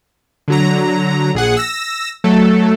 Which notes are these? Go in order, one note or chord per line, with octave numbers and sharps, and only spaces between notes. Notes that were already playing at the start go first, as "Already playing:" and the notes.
D3 F#3 A#5
A#1 G#4 F#5
E6 A#6
F#3 A3 A4